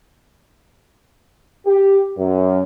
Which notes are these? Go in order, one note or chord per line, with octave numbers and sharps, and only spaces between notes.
G4
F#2